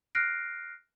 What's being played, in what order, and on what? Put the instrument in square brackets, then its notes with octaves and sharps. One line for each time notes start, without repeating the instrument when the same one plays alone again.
[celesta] F6 F#6 A#6 C7 D7